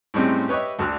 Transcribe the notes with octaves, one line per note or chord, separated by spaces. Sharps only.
A2 C3 G3 G#3 C4 C#4
G4 B4 C#5 D#5 E5
D2 D3 F#4 F6